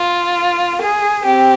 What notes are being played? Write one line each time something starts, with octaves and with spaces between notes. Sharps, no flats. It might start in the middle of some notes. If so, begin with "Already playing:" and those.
Already playing: F4
G#4
C4 G4